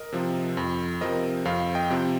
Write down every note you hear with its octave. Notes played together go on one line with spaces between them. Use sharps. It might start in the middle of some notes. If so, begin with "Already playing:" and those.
Already playing: A#4 D#5
C3 F3 C4
F2
C3 F3 C4 A#4 D#5
F2 C5 F5
D#5 G5
C3 F3 C4